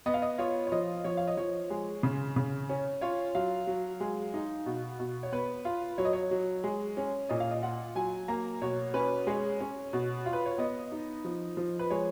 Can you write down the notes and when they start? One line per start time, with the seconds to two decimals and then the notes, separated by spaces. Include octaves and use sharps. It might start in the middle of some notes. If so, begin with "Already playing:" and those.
0.06 B3 D#5
0.14 F5
0.22 D#5
0.38 F4 C#5
0.67 C#5
0.72 F3 D#5
1.04 F3 C#5
1.17 F5
1.28 D#5
1.37 F3 C#5
1.70 G#3
2.03 C#3
2.36 C#3
2.70 C#4
3.01 F4 C#5
3.35 F#3 F5
3.67 F#3
4.00 G#3
4.34 D#4
4.66 B2
4.99 B2
5.23 C#5
5.32 B3 B4
5.65 F4
5.98 F#3 C#5
6.05 D#5
6.13 C#5
6.31 F#3
6.64 G#3
6.97 C#4
7.29 A#2 D#5
7.40 F5
7.51 D#5
7.62 F4 F#5
7.95 F#3 G#5
8.28 A#3 A#5
8.62 B2 C#5
8.94 C#4 B4
9.27 G#3 C#5
9.61 C#4
9.93 B2
10.26 F4
10.33 B4
10.46 C#5
10.58 B3 D#5
10.92 D#4
11.25 F3
11.57 F3
11.79 B4
11.90 G#3 C#5